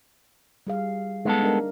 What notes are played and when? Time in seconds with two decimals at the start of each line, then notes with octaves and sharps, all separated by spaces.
0.67 G3 G#4 F5
1.25 G#3 B3 D#4 A4
1.43 D4 A#4